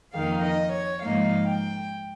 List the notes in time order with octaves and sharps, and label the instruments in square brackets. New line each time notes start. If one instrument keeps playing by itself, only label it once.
[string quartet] F2 D#3 A#3 F5
D#5
C#5
G#2 F3 A#3 D#4 F5
G5